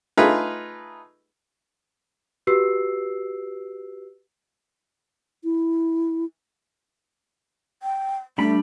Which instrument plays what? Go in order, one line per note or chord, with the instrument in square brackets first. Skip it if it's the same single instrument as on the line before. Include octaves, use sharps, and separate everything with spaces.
[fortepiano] A3 D#4 F4 G#4 B4
[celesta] F#4 G4 B4 E6 C7
[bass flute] E4
[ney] G5
[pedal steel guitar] G3 D4 B5 [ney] A3